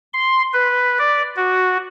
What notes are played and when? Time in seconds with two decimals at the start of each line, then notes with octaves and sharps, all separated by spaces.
0.13 C6
0.53 B4
0.98 D5
1.36 F#4